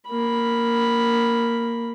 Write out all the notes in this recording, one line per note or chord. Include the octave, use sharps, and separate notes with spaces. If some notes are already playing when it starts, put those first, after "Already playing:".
A#3 B5